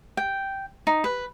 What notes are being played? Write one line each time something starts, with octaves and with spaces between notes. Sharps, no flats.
G5
D#4
B4